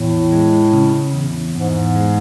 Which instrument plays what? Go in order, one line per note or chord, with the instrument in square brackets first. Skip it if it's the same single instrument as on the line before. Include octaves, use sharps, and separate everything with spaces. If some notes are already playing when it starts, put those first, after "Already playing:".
Already playing: [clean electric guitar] E2 [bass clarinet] A2
[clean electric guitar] G#3
C#3
E2
[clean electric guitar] E2 [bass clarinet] G#2
[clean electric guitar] G#3